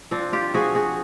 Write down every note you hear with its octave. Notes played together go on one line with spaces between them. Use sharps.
F3 C4 D4
F4 G4
F3 F#4 G#4
F#4 G#4